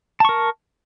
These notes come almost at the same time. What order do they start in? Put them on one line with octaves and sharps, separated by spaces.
A5 C#6 A#4